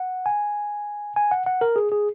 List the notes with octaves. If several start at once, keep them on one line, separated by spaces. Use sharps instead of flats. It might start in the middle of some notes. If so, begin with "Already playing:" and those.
Already playing: F#5
G#5
G#5
F#5
F#5
A#4
G#4
G#4